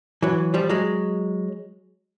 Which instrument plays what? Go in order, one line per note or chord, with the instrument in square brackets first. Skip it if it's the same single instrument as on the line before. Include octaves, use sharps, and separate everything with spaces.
[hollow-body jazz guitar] E3 F#3
F3 G3
F#3 G#3